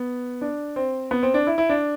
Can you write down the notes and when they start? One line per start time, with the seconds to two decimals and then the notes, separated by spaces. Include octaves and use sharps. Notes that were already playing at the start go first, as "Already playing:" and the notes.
Already playing: B3
0.42 D4
0.76 C4
1.11 B3
1.23 C4
1.34 D4
1.47 E4
1.58 E4
1.69 D4